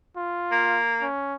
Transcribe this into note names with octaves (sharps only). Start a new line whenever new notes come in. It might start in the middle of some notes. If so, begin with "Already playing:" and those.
F4
A#3
C#4